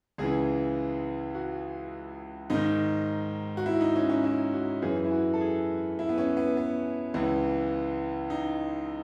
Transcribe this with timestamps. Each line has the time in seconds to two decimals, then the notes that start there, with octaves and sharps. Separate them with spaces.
0.18 C#2 C#3 E3 G#4
1.35 F#4
2.50 G#2 D#3 D#4
3.57 F#4
3.66 E4
3.81 D#4
3.96 C#4
4.10 C#4
4.24 E4
4.53 F#4
4.82 F#2 E3 G#4
5.04 E4
5.11 F#4
5.34 A4
5.41 G#4
5.99 E4
6.09 B3
6.18 C#4
6.37 B3
6.57 B3
7.14 C#2 C#3 E3
8.30 D#4